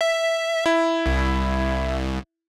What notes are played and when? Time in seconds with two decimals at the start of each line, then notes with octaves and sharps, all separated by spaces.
0.01 E5
0.66 E4
1.06 C2